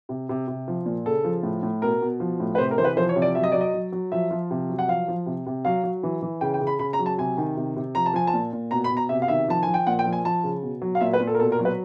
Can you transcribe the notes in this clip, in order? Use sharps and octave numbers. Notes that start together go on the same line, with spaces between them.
C3
C3
C3
F3
A#2
C#3 A4
F3
A2
A2
B2 A#4
B2
F3
A2
B4
C3 C5
A#4
E3 C5
B4
F3 C5
C#5
C3
D5
F#3 E5
D#5
F#3 D5
D#5
F#3
F#3
F3 E5
F3
C3
F#3
F#5
F3 F5
F3
C3
C3
F#3 F5
F#3
E3
E3
C#3 G5
G5
C#3
B5
C#3 B5
A#5
F#3
A5
C3 G#5
D#3
C3
C3
F3 A#5
A5
F3 G#5
A5
A#2
A#2
B2 A#5
B5
B2
A#5
C3 E5
F5
D#3 E5
F3 A5
F3 G#5
G5
A#2 F#5
G5
F3
G#5
F3 A5
C#3
B2
F#3
F5
A#2 E5
B4
A#2
A4
A#4
B2 A4
A#4
F#3
B4